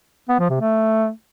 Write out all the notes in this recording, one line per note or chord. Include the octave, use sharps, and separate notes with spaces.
B3
F3
C3
A3